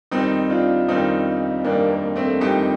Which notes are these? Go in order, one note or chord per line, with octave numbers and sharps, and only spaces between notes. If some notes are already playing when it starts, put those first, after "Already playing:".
F2 D#3 G3 C4 D#4
D4 F4
F2 D#3 G3 C4 D#4
F2 D#3 G3 A#3 D4
A#3
A3 C4
F2 D#3 G3 D#4 G4